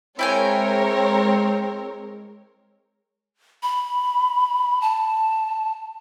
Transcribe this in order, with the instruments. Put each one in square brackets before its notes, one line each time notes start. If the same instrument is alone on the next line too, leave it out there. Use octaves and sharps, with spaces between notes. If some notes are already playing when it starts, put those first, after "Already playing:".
[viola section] G#3 [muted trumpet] C4 [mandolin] E4 G5 G#5 [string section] A#4 C#5
[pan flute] B5
A5